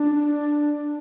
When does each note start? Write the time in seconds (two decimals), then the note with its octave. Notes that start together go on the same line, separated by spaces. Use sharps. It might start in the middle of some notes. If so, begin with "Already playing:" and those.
Already playing: D4